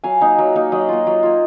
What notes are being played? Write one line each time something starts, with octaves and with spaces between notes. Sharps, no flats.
F#3 F5 G#5
A#3 D#4
F#3
A#3 D#4
F#3 D#5 F#5
A#3 F4
F#3
A#3 F4